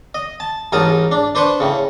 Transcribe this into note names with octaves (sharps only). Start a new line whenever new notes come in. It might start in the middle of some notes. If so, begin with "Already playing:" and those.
D#5
A5
A1 G#2 D#4 A#4 A5 D#6
D4
D4 B4 C5 C6 C#6
A2 C#3